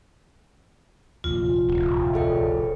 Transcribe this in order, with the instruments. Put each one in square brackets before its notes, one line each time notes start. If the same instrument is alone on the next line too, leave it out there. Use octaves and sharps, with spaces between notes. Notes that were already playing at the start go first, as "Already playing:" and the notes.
[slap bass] F1 A#1 D#2 [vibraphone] F4
[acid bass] D1
[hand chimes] G#4 A4 G5